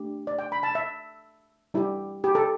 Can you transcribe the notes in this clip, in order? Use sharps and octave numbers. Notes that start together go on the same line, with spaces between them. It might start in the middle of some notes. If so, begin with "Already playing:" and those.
Already playing: A3 D4 G4
D5
G5
B5
A5
E5
G3 E4 G4
G4
A4